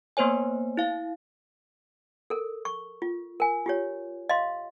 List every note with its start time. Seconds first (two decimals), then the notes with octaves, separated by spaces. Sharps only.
0.17 A#3 B3 C5 C#5 G#5
0.77 E4 F5
2.30 A4 A#4
2.65 C#6
3.02 F4
3.40 A#4 G#5
3.66 F4 G4 C#5
4.29 D#5 F5 C6